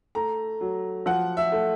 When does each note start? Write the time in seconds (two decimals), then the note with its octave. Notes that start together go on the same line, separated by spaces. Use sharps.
0.15 A3 A#5
0.61 F#3
1.06 F3 F#5
1.37 E5
1.52 A3